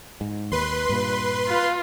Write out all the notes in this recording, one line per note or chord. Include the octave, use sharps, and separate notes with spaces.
G#2
D#2 B4 C6
G2 A#2
F4